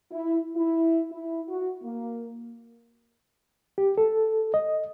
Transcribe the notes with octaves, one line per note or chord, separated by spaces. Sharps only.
E4
E4
E4
F#4
A#3
G4
A4
D#5